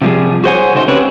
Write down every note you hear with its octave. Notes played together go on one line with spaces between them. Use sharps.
C3 F3 G3 G#4
F#4 G#4 C5 C#5 F#5 G#5
C#3 A3 D#4 C5
C4 C#4 G4 B4 C#5